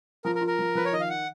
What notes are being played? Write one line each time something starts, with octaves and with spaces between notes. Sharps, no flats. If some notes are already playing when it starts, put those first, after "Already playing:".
F3 A#4
A#4
F4
A#4
F3
F3 B4
C#5
D#3 D#5
F5
F#5